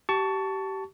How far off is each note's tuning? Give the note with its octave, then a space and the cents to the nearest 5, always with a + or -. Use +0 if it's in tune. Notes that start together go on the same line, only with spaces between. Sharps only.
G4 -25 A5 +0 C#6 +20